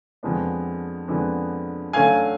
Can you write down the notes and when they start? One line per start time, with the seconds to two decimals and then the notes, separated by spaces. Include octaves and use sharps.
0.23 F2 D3 G#3 B3 D4
1.08 F2 D3 G#3 B3 D4
1.93 F#2 D3 F#3 A3 C#4 F5 G#5